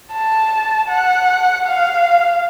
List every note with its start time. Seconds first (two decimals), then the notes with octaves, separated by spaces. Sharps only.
0.12 A5
0.89 F#5
1.66 F5